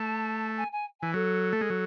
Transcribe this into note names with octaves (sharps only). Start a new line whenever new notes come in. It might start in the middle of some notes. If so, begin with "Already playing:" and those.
Already playing: A3 A5
G#5
G#5
E3 G#5
F#3 A4
A3
G#3
F#3